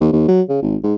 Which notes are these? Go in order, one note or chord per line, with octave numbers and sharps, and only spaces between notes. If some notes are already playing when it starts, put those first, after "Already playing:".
D#2
D#2
F#3
C#3
G#1
G#2